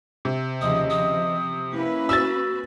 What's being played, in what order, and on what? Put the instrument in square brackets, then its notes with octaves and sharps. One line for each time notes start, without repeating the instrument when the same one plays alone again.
[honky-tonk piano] C3
[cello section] D#2 C#3 F3 [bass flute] D#5 [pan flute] D#6
[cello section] F3 [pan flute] D#6
[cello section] A#3 C#4 B4 [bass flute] E4
[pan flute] F#4 [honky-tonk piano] E6 A6